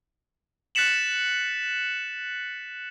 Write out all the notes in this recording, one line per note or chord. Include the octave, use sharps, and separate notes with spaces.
F#6 A6 B6 C#7 E7 F#7